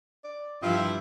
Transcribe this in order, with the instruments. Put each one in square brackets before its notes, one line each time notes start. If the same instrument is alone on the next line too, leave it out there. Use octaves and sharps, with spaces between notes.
[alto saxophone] D5
[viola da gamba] G2 F3 [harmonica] E4 E5 G5 [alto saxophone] F4